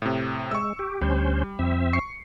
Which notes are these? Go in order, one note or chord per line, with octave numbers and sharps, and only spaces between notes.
A2 C3
G#3 C#6 E6
G4
D2 G3 C#4 C5
F2 C4 E5
C#6 C7 C#7